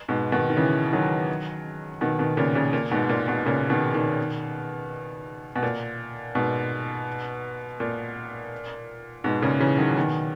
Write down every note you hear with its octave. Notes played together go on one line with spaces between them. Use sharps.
G#2 B2
B2 D#3
D#3
C#3 E3
D#3 F#3
B2 D#3
B2 D#3
A#2 C#3
A#2 C#3
A#2
G#2 B2
A#2
G#2 B2
A#2 C#3
B2 D#3
B2 D#3
B2
A#2
G#2 B2
A#2
G#2 B2
A#2 C#3
C#3 E3
D#3 F#3
B2 D#3